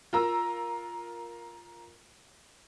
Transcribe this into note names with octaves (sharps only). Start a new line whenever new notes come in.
F4 A#4 A#5 E6